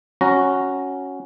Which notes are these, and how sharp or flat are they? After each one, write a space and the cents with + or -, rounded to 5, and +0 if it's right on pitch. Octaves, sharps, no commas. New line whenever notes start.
C#4 +0 F#4 +0 A#5 +0